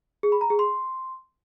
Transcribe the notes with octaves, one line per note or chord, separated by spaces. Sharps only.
G#4
B5
A#5
G#4
C6